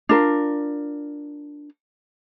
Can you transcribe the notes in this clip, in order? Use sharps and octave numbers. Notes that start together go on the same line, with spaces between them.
D4 F4 A#4